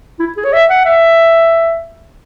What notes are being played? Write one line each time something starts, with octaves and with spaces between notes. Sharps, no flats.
E4
G#4
C#5
E5
F#5
E5